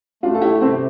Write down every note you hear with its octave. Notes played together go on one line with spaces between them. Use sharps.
A3 D4 F4
A4
E4 G4
C3 C4 E4